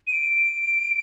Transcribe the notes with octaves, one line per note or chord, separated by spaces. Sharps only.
D#7
D7